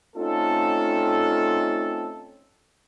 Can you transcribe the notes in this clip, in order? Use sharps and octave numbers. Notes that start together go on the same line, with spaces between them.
A3 C4 C#4 D#4 F4 A4